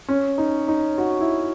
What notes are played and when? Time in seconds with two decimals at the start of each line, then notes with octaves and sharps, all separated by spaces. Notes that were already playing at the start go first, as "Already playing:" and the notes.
0.08 C#4
0.38 D#4
0.68 D#4
0.98 F#4
1.21 E4